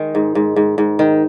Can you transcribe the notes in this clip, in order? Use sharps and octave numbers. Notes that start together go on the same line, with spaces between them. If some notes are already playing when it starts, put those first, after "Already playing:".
Already playing: D#3 G#3
G#2
G#2
G#2
G#2
D#3